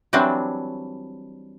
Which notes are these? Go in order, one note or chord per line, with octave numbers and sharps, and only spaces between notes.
E3 F#3 G3 C4 D4